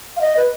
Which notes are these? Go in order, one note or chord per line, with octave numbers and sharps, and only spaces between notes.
F5
D#5
B4